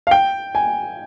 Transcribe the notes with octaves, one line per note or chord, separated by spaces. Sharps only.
F5
G5
G#5